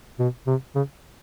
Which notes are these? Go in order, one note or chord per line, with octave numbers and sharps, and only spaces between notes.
B2
C3
C#3